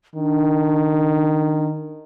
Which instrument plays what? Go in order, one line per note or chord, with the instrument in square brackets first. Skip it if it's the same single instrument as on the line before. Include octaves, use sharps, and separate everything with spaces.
[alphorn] D#3 [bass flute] D4